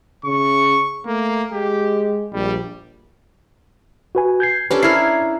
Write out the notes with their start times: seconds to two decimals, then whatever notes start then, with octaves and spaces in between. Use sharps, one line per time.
0.25 C#3 C#6
1.06 A3 A#3
1.52 G#3 G4
2.33 A#1 G3
4.15 F#4 B4 G#5
4.40 G6 G#6 C7
4.71 C#4 D4 G4 A4 B4 C5
4.83 E4 A#4 F6 G#6 C7